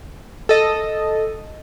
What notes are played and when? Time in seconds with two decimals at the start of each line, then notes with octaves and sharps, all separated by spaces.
0.49 A4 D#5